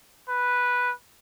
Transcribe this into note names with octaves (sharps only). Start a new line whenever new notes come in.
B4